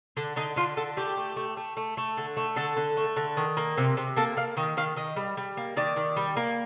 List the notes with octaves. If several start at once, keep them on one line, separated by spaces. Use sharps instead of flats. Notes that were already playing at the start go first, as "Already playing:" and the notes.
D3 D4
D3 D#4
D3 F4
D3 A4
A3 G4
A3
A3
A3
A3
A3
D3
A3
D3 A4
D3
A3
D3
D#3
A#3
C3
C3
A#3 A4
A#3 F5
D#3 D#5
D#3 F5
D#3 D#5
G3
G3
A#3
D#3 D5
D#3
G3
A#3